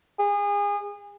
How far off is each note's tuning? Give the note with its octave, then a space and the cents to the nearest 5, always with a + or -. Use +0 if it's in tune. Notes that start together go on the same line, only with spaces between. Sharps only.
G#4 -30